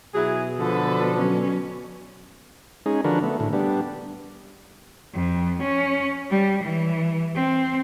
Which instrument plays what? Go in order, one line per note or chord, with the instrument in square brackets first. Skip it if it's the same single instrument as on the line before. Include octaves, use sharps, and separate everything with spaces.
[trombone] B2 [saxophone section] F#3 E4 G#4
[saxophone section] D3 F3 [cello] A4 B4
[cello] F#3 C#4
[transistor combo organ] G#3 C#4 D#4 G#4
D3 F3 D4 F#4 A#4 B4
A3 B3
A2 D3
G3 B3 D4
[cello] F2
C#4
G3
E3
C4